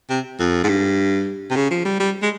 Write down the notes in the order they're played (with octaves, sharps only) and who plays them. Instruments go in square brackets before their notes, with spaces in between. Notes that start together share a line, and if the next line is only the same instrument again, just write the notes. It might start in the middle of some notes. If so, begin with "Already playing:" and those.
[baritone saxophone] C3
F2
G#2
G2
C3
C#3
F3
G3
G3
G#3